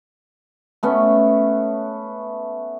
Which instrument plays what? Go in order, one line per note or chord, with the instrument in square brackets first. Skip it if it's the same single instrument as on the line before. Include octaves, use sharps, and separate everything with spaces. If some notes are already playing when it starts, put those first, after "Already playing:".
[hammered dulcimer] A3 B3 C#4